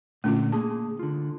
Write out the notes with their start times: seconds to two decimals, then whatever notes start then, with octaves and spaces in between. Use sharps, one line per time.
0.24 A#2 D3 A3 C#4 F4
0.52 A#3 G#4 A5
0.99 D3 F4